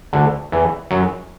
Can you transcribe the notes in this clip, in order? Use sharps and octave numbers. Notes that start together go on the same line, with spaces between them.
D2 D3
E2 E3
F#2 F#3